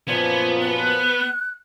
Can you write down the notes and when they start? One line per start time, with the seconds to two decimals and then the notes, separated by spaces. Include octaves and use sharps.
0.08 F#2 A#2 F3 B3 G#6
0.62 F#6